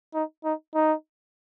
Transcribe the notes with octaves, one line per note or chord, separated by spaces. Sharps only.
D#4
D#4
D#4